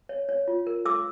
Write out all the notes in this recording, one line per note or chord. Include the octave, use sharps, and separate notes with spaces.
C#5
C#5
F4
A#4
A4 D6 E6